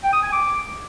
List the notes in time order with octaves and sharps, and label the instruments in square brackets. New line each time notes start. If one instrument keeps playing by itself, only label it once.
[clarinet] G5
D#6
G#5
D6